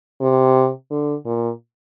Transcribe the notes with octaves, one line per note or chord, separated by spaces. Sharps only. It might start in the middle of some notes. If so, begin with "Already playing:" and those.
C3
D3
A#2